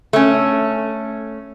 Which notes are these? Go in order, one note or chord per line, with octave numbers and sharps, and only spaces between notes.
A3 C#4